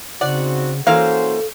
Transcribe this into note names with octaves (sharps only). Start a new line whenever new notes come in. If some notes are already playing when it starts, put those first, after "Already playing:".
C#3 C4 D#4 F#4 D5 F#5
E3 A#3 C#4 F#4 A4 C5 F5